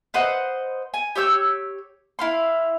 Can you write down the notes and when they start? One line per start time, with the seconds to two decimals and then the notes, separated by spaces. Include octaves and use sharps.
0.14 B4 C5 D#5 F#5
0.94 G#5
1.16 G4 C#5 E6 G6
2.19 E4 F5 C6